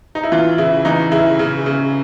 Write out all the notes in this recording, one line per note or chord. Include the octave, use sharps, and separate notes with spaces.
D#4
E4
E3 F4
C#3 E4
E3 D#4
C#3 E4
C#3
C#3